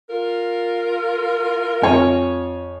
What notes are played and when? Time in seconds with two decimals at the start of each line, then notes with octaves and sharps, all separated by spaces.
0.10 F4 A#4
1.82 F2 C#5 G#5